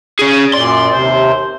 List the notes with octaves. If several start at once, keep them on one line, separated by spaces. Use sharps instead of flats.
C#4 G#4
F#2 A#2 D5 C6
D#2 C3 C5